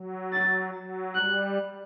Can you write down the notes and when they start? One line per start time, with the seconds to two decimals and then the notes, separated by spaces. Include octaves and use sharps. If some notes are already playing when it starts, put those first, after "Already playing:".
Already playing: F#3
0.32 A6
0.74 F#3
1.15 G3 F#6